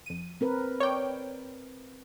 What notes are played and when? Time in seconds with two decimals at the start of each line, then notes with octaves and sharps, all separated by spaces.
0.06 F2 D#7
0.41 C4 A#4 B4
0.80 C#5 D5 G5